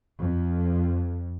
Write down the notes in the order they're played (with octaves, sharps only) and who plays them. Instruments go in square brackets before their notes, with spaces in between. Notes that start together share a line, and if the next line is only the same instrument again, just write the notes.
[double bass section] F2